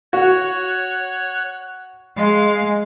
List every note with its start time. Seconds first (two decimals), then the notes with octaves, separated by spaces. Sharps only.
0.13 F#4 C#5 F#6
2.16 G#3 F5